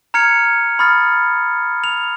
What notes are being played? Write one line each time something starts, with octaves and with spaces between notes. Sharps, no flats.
A#5 F6 G#6 C#7 F7
B5 C#6 D#6 F6 A6
F7